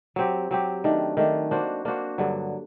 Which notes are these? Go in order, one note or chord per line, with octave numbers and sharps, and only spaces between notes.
F#3 C4 G4
F#3 C4 G4
D#3 A3 D4
D#3 A3 D4
A#3 D4 F#4 C5
A#3 D4 F#4 C5
G2 D3 F#3